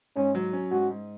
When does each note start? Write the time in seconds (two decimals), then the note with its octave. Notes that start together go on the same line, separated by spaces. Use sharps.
0.16 G#2 C#4
0.35 F#3
0.53 C#4
0.71 G#2 F#4
0.90 G#2